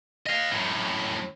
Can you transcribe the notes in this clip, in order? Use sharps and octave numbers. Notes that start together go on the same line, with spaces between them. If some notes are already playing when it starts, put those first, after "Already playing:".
D#5 F5
F#2 A2